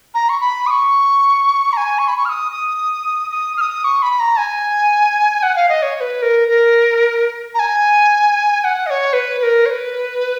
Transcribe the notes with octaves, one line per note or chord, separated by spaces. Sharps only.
A#5
C#6
B5
D#6
C#6
A#5
G#5
C#6
B5
C#6
F6
D#6
D#6
D#6
F6
D#6
C#6
B5
A#5
G#5
F#5
F5
D#5
C#5
C#5
B4
A#4
A#4
A#5
G#5
G#5
F#5
D#5
C#5
B4
B4
A#4
C#5
B4